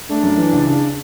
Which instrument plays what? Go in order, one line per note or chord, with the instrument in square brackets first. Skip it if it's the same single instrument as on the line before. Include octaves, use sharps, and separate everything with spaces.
[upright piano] A3 [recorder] D4
[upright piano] F#2
E3
C#2
C#3